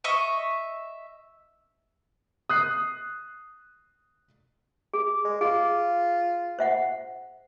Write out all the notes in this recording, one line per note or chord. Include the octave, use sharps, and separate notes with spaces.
D#5 E5 C#6
D#6 F#6 C7
G#4
G#3
F4 G#4
C5 E5 F#5